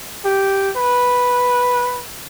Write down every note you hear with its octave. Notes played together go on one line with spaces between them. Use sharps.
G4
B4